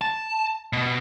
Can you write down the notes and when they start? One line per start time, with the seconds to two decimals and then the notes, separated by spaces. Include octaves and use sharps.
0.01 A5
0.73 B2